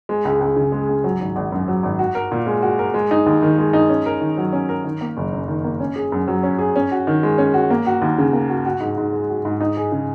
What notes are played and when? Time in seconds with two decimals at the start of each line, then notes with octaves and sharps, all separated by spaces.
0.09 G#3
0.25 C#2
0.41 C#2
0.56 C#3
0.72 G#3
0.89 C#2
1.04 F#3
1.20 G#1
1.36 G#1
1.52 F#2
1.68 F#3
1.83 G#1
1.99 F#4
2.15 A#4
2.32 A#2
2.46 G#3
2.62 F#4
2.79 A#4
2.94 G#3
3.11 D#4
3.26 D#2
3.42 D#3
3.59 G#3
3.73 D#4
3.90 C#4
4.06 A#4
4.21 D#3
4.38 F#3
4.53 C#4
4.69 A#4
4.84 D#3
5.01 A#3
5.17 F#1
5.33 F#2
5.48 D#3
5.64 A#3
5.80 C#4
5.96 G#4
6.12 F#2
6.28 F#3
6.43 C#4
6.59 G#4
6.76 C#4
6.91 F#4
7.07 D#3
7.23 G#3
7.38 C#4
7.54 F#4
7.70 A#3
7.86 F#4
8.01 D#2
8.18 C#3
8.33 A#3
8.49 F#4
8.66 F#4
8.81 G#2
8.98 G#2
9.13 G#3
9.29 F#4
9.45 G#2
9.60 D#4
9.77 G#4
9.92 C#3